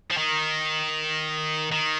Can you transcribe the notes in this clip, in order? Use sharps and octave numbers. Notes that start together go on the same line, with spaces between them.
F3
D#3
D#3